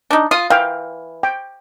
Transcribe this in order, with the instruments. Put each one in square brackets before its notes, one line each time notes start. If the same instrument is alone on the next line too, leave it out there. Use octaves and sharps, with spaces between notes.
[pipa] D4 D#4
[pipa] F4 [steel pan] D#6
[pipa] E3 [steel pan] F5 G5
[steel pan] G5